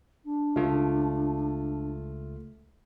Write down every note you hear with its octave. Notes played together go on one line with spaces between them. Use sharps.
D4
C#2 A3 F4